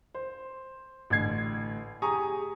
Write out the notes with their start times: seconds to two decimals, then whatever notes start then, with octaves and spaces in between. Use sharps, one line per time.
0.14 C5
1.10 A1 A2 D3 G#6 C7
2.02 G4 G#4 G#5 A#5 C#6 D#6